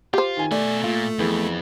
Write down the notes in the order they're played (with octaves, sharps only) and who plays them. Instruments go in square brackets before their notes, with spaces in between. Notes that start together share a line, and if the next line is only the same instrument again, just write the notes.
[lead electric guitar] F4 [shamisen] G4 C5
[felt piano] D#3 G#5
[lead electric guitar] B2 G#5 [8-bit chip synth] A3 [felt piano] D5
[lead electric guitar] A#2 [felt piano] F4
[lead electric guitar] F2 [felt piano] E3 B3 G#4